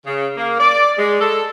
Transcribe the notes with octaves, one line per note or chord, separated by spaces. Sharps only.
C#3
A#3
D5
G#3
A4